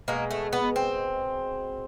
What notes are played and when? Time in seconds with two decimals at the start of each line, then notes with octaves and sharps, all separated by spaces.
0.08 B2 G#3 A#3
0.30 A3
0.53 B3
0.76 C4